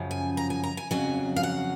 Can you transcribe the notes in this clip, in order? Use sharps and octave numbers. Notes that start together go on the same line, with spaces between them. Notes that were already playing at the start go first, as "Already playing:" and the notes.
Already playing: F#2 C#3 F3
G#5
A#5
G#5
A#5
G#5
F2 C#3 F#3 G#5
F5
F#5